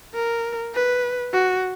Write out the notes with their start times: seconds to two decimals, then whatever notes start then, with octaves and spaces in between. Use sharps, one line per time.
0.14 A#4
0.74 B4
1.33 F#4